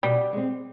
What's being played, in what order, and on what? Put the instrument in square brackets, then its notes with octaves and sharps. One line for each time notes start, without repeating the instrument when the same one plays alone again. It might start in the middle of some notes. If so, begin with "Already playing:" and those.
[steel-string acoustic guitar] B2 [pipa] G3
[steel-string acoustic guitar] G#3 C4